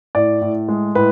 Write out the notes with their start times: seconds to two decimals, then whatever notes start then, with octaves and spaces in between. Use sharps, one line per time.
0.15 A2 D5
0.42 A2
0.69 G#3
0.95 A2 B4